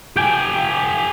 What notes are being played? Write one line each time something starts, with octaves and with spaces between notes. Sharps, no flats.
G4 G5 G#5